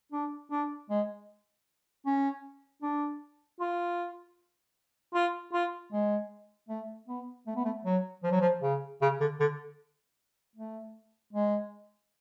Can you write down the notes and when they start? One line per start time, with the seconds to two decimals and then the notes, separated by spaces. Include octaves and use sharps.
0.12 D4
0.51 D4
0.90 G#3
2.06 C#4
2.82 D4
3.60 F4
5.14 F4
5.53 F4
5.93 G#3
6.69 A3
7.08 B3
7.47 A3
7.56 B3
7.65 A3
7.85 F#3
8.24 F3
8.32 F#3
8.41 F3
8.62 C#3
9.02 C#3
9.21 D3
9.40 D3
10.56 A3
11.33 G#3